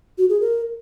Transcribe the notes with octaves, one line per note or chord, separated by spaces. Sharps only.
F#4
G#4
A#4